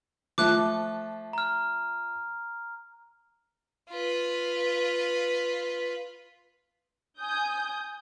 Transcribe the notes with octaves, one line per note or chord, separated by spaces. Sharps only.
F3 A3 D6 F#6
A#5 F6
F4 B4
G#5 D#6 G6